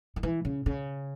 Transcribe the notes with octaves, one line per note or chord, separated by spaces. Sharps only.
D#3
E3
C#3
C#3